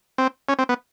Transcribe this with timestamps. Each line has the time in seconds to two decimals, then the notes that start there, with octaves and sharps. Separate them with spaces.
0.18 C4
0.49 C#4
0.59 C4
0.69 B3